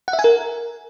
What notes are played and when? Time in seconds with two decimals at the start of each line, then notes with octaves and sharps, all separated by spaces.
0.08 F#5
0.13 E5
0.19 G#5
0.24 A#4